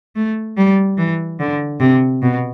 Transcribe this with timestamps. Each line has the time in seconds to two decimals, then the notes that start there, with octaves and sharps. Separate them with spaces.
0.16 A3
0.57 G3
0.97 E3
1.40 D3
1.80 C3
2.22 B2